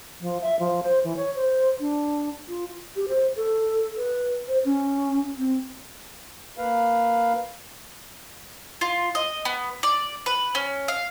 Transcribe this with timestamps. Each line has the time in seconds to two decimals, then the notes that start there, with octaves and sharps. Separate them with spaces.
0.21 F3
0.41 E5
0.60 F3
0.83 C5
1.04 E3
1.17 C#5
1.35 C5
1.80 D4
2.49 F4
2.96 G4
3.08 C5
3.36 A4
3.97 B4
4.48 C5
4.65 C#4
5.37 C4
6.58 A#3 B4 F5
8.81 F4
9.15 D#5
9.45 B3
9.83 D5
10.26 B4
10.55 C#4
10.88 F5